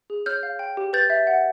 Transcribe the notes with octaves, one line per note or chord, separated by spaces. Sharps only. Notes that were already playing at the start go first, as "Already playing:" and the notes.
G#4
C#5 F6 G6
F5
G5
G4
B4 G6 A6
E5
F#5